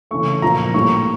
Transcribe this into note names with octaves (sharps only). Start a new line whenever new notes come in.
C#3 E3 A3 C#6
A#2 F3 A#3 A#5
A2 G3 A#3 C#6